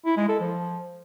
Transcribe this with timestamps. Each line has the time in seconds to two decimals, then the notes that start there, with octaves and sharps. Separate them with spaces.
0.06 E4
0.17 G#3
0.29 A4
0.40 F3